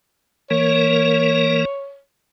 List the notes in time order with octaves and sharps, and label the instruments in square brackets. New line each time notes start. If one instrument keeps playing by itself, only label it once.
[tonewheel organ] E3 A#3 A#4 [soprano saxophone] C#5